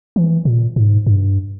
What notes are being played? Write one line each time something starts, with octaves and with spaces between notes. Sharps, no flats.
E3
A#2
G#2
G2